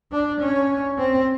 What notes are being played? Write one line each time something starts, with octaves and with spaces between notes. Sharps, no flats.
D4
C#4
C4